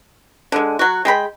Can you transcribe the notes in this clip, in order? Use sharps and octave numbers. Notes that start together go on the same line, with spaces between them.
D3 G#3
F#3 F#4
G#3 G5 B5